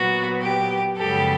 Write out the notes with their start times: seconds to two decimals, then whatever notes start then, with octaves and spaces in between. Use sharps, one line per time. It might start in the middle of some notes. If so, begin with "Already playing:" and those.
Already playing: A#2 F#3 B3 F#4
0.42 G4
0.96 F#2 C#3 F3 G#3 B3 G4 A4